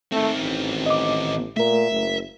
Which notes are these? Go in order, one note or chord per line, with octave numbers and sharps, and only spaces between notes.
D#3 A3 C4
A1
D#5 D6
A#2 A3 A#4 E5
F#1